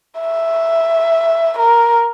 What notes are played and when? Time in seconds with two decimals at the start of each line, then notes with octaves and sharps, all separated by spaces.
0.19 E5
1.59 A#4